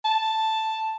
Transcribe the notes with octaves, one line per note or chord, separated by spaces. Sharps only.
A5